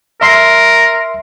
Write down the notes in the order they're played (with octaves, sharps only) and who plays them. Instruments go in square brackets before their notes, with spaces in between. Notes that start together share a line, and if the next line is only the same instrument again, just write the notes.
[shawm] A#4 [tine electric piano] E5 C6 C7